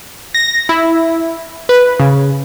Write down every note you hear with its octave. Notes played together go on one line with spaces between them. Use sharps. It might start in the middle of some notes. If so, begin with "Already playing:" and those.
A#6
E4
B4
C#3